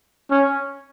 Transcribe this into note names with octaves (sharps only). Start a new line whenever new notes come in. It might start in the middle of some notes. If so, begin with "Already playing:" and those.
C#4